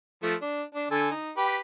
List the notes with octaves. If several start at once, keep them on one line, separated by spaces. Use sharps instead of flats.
F3 A3 A4
D4
D4
D3 A4 G#5
D#4
G4 B4